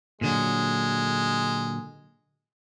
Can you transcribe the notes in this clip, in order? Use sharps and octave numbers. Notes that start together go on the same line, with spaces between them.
A#2 D3 F#3 G#3